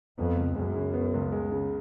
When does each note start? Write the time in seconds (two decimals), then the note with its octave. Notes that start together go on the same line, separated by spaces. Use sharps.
0.18 F2 B3
0.36 C#2
0.56 F#2 G#3
0.76 C#3
0.94 B3
1.14 C#2
1.32 G#3
1.52 C#3